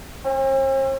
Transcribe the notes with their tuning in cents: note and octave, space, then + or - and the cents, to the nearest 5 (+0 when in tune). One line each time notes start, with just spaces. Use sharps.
C4 +45